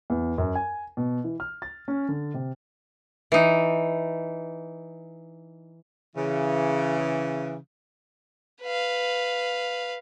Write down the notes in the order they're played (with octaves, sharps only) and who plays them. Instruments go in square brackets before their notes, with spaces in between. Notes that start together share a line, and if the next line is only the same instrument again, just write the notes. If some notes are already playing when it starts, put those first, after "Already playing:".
[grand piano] E2
F#2
G#5
B2
E3
F6
A6
C#4
D3
C3
[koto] E3 D#4
[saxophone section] C#3 E3
[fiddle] B4 F5